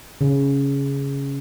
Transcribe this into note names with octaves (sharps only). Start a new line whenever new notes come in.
C#3